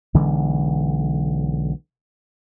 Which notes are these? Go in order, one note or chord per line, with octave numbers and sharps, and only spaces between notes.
B1 D3 E3 G#3